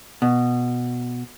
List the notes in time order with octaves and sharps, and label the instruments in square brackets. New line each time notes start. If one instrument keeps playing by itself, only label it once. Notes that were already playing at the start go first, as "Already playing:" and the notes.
[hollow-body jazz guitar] B2